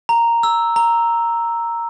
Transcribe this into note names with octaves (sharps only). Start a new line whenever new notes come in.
A#5
E6
A#5